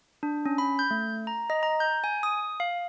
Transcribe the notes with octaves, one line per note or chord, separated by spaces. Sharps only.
D4
C#4
B5
G6
A3
A#5
D#5
A#5
G6
G#5
D#6
F5